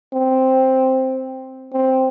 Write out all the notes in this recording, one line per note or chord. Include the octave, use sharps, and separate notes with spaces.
C4
C4